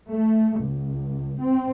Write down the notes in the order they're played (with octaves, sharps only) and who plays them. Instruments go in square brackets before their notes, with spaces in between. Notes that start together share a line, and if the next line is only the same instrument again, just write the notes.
[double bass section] A3
C#2
C4